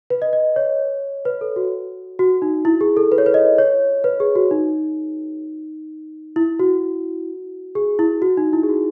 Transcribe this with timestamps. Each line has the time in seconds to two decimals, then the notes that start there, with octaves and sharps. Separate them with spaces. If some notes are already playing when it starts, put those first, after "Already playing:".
0.10 B4
0.22 D#5
0.33 D#5
0.56 C#5
1.25 B4
1.41 A4
1.56 F#4
2.19 F#4
2.42 D#4
2.65 E4
2.81 G#4
2.97 A4
3.12 B4
3.18 C#5
3.26 B4
3.34 D#5
3.58 C#5
4.04 B4
4.20 G#4
4.36 F#4
4.51 D#4
6.36 E4
6.59 F#4
7.75 G#4
7.99 E4
8.22 F#4
8.37 D#4
8.53 E4
8.63 G#4
8.69 F#4